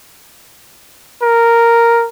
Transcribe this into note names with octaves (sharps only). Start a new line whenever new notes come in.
A#4